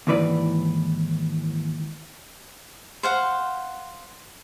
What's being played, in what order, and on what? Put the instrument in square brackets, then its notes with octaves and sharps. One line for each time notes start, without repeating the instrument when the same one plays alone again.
[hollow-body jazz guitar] D#2 G#2 E3 B4 D5
[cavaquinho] C5 F5 F#5